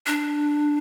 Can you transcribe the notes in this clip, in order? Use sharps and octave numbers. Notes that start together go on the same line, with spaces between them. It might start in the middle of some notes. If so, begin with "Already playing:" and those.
D4